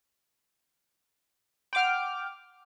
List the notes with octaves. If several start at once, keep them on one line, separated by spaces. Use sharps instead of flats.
F#5 G5 C6 D6 F6